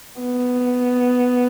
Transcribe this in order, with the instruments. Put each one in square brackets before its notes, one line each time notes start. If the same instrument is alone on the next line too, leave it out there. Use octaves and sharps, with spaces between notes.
[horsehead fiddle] B3